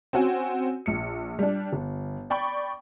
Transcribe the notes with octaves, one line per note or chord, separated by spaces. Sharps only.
C4 C#4 F#4 F#5 G#5
A#1 C#7
G3 D4
G1
D5 G5 B5 C#6